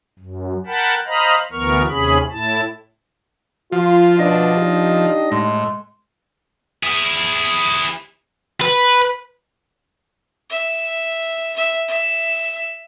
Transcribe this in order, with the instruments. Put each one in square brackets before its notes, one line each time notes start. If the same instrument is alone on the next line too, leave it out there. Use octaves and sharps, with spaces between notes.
[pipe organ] F#2
A#4 F#5 G5 A5 B5
C5 D#5 F5 A#5 B5
D2 E3 B3 A#4 C#6 F6
D#2 C3 C#4 G#4 B5
A2 E4 A5
[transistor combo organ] F3 [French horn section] F4
[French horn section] B2 D4 [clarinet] D#5
[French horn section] D4 D#4 G4
[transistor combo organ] A2 [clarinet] G#3
[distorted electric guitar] E4 G#4
B4
[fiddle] E5
E5
E5